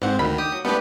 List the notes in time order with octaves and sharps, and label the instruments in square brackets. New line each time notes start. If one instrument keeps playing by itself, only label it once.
[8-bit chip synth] G#2 C4 [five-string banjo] F3 F#5
[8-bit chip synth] D2 D#3 [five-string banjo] B5
[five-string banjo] G4 [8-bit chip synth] D#6
[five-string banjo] F#3
[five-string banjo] A3 D4 [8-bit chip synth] B3 G4 B4